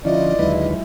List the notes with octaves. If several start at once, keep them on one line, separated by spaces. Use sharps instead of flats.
D3 F3 C#4 E4 F4 D5 D#5
D#2 D3 F#3 G#3 E4 B4